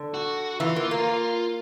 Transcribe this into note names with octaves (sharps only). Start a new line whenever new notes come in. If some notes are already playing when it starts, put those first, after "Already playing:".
Already playing: D3
F#4
E3 F4
A#3
A#3